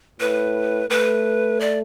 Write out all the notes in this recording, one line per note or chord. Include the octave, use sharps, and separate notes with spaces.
A2 B4
A3 B4
D5